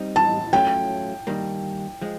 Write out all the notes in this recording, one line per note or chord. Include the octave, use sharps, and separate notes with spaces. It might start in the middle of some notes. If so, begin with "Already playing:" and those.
Already playing: G3 C4 D#4
A5
F#3 A3 C#4 F4 G5
D#3 G3 A#3
F3 G#3